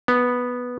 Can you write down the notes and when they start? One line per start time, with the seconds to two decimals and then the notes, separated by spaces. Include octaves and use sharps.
0.08 B3